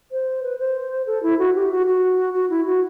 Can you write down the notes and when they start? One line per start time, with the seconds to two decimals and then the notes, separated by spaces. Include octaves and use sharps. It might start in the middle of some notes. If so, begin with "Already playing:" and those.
0.12 C5
0.43 B4
0.59 C5
1.07 A4
1.23 E4
1.39 F#4
1.55 G4
1.71 F#4
1.87 F#4
2.34 F#4
2.50 E4
2.66 F#4